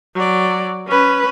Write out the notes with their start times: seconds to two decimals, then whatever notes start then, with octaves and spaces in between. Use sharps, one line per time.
0.15 F#3 D5
0.87 C#4 B4